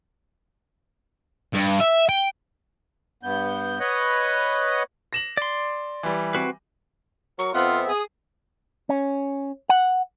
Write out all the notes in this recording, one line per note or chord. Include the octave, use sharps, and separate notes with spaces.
G2
E5
G5
G2 B3 G6
B4 C#5 D#5 F#5
A#6 E7 F#7
D5 C6
E3 G3
C4 F#4 B4
F#3 A#4 C#6
F2 B3 C4 F4 E5 F#5
G#4 D#6
C#4
F#5